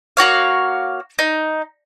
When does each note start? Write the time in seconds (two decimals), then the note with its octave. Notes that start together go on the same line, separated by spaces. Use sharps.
0.17 A#3 F#4 C#5 F5
1.19 D#4